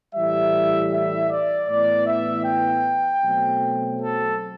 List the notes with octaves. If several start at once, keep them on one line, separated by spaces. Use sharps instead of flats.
A2 E3 G3 E5
E5
D5
A2 E3 B3 D5
E5
G5
B2 F#3 A3 C4
A4